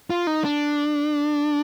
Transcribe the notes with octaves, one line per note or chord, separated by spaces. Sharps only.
F4
D#4
D4